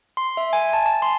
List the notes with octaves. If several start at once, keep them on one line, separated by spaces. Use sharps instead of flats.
C6
E5
G#5
A5
A5
C6